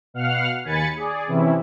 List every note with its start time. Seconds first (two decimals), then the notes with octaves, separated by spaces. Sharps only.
0.14 B2 F5 F#5 F6
0.64 D#2 G#5 B5 A6 C#7
0.97 G#4 D5
1.28 C3 E3 C#4 E4